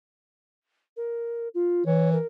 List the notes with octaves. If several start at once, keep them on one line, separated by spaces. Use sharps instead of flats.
A#4
F4
E3 C#5
A#4